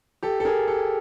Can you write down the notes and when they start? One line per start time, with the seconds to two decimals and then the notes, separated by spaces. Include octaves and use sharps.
0.23 G4 A4
0.40 A4
0.45 G#4 A#4
0.68 G4 A4